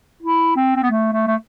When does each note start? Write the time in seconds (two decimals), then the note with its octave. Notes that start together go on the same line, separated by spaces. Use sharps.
0.23 E4
0.57 C4
0.76 C4
0.83 B3
0.90 A3
1.13 A3
1.28 A3